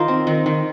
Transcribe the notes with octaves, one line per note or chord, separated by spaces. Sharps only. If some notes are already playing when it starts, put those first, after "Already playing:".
Already playing: D#3 D#4 F4 A#4 C5
C4
D#3
D#3